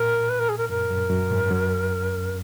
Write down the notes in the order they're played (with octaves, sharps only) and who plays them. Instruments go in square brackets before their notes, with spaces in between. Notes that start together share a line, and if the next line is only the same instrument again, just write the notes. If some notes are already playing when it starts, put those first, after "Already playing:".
Already playing: [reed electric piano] A#2 [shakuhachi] A#4
[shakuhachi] B4
A#4
G#4
A#4
[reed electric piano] F#2 [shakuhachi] A#4
[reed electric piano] F#2
F#2
G#2
F#2